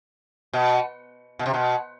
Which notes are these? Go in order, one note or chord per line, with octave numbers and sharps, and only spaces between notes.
B2
B2
C3
B2